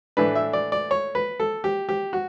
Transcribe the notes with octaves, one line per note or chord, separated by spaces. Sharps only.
A2 E3 A3 D4 B4
E5
D5
D5
C#5
B4
A4
G4
G4
F#4